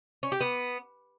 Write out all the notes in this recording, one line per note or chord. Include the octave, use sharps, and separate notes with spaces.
C#4
G4
B3